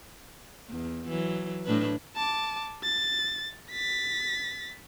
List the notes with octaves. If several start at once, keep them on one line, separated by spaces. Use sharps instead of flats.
E2
E3 F#3
A2 D4 B4
A5 D6
A6
A6 B6